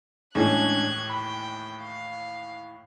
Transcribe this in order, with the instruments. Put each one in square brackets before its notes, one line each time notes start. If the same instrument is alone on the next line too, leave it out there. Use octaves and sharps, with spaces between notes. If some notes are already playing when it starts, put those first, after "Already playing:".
[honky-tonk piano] D#2 A2 E3 [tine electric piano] G#3 C#4 D4 [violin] F#6 G#6
[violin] G5 [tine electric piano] B5
[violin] F5